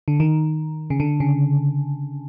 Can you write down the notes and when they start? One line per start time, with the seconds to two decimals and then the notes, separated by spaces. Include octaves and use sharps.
0.08 D3
0.20 D#3
0.90 C#3
1.00 D3
1.20 C#3